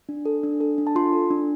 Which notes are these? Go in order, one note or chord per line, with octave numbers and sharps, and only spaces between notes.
D4
A4
D4
A4
D4
A5
F4 C6
A4
D4